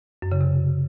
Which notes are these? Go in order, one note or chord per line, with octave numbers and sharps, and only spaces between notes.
F#2
C#3
C3